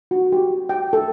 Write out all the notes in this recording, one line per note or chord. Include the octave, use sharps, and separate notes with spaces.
F#4
G4
G5
A4